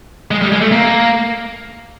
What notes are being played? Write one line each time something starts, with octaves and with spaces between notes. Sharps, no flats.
G#3
G3
G#3
A3
A#3